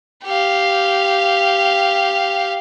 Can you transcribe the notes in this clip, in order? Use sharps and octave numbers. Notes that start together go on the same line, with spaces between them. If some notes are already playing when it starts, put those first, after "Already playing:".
G4 F5